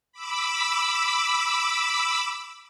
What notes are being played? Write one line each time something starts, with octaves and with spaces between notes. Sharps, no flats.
B5 D6 E6